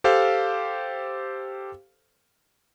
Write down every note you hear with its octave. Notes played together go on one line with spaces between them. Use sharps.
G4 A4 C5 F5